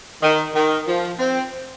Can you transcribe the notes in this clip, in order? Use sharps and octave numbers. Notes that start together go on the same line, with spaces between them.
D#3
D#3
F3
C4